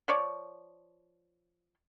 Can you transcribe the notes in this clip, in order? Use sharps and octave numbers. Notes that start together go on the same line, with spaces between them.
F3 C#5 D5